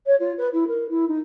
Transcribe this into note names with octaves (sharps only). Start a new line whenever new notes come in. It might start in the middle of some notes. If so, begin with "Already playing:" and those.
C#5
F4
B4
E4
A#4
E4
D#4